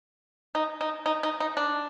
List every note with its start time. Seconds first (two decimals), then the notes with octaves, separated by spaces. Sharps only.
0.55 D#4
0.81 D#4
1.06 D#4
1.23 D#4
1.40 D#4
1.57 D4